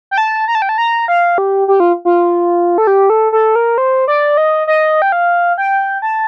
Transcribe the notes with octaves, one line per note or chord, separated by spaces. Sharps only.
G5
A5
A#5
A5
G5
A5
A#5
F5
G4
G4
F4
F4
A4
G4
A4
A4
A#4
C5
D5
D#5
D#5
G5
F5
G5
A5